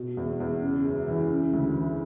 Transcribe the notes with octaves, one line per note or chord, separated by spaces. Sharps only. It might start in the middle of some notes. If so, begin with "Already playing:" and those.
Already playing: B2
E2
E2
C#3
F#2
E3
C#3
D2
E3